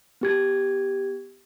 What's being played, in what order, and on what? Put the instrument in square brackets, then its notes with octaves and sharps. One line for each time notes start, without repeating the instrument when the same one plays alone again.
[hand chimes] B3 G4 G#6